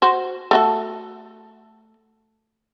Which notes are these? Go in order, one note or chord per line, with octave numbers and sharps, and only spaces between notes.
F#4 C5
A3 F#4 A4